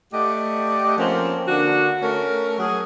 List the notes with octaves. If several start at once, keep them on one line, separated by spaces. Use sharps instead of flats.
A3 G4 D5 D#5 F#5
F3 A#3 C4 C#4 A#4
D3 A#3 D4 F#4
A3 C#4 A#4
F#3 G#4